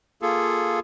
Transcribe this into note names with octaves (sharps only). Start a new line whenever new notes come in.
A#3 F4 G#4 A4